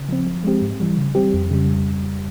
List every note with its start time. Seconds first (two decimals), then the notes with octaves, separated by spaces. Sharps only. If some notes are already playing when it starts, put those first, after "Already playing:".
Already playing: C#3
0.09 F3 C4
0.27 F3
0.44 G#3 C4 G4
0.62 G#2
0.80 E3 G3
0.97 C#3
1.15 G3 C4 G4
1.34 F2
1.51 C#3 G3